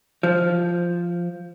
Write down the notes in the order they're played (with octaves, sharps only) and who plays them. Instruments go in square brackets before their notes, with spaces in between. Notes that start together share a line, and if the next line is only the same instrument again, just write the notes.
[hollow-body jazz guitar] F3